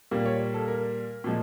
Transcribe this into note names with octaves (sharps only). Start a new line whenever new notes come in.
A#2 G3 A#3
C#5
A4
A#4
A#2 F3 G#3